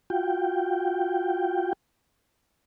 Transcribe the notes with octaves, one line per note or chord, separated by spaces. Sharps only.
F4 F#4 G5